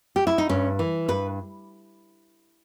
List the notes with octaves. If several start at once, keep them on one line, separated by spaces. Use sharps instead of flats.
G4
E4
D#4
G2 C#4
E3
G2 B4